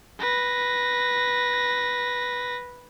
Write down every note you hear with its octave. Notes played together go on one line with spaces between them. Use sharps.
B4 A#6